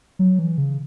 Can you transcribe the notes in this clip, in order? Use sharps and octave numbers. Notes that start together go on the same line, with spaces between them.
F#3
E3
C#3